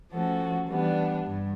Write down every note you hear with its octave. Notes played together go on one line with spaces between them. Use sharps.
F3 A3 C#4 F#4 A4
E3 G3 B3 D4
G2